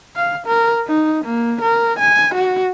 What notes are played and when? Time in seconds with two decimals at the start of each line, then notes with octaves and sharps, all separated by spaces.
0.16 F5
0.47 A#4
0.87 D#4
1.25 A#3
1.61 A#4
1.99 G#5
2.34 F#4